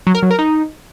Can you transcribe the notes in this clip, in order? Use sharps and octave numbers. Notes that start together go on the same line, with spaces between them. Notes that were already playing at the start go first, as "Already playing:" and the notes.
F#3
A#4
F#3
A#4
D#4